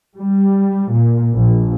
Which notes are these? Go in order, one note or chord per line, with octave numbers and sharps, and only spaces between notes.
G3
A#2
A#1